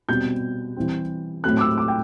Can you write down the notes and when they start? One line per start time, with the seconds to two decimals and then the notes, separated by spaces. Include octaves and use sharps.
0.08 B2 G3 C4 G6
0.77 E3 G3 C4
1.44 A2 F#3 A3 C4 F#6
1.57 D6
1.61 E6
1.78 D6
1.88 G5